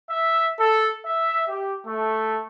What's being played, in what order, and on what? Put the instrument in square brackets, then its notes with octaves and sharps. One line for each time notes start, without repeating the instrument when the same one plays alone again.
[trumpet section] E5
A4
E5
G4
A3